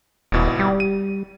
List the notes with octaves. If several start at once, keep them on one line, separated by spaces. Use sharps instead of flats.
D#1 G#1 B2 E4
G3
D#7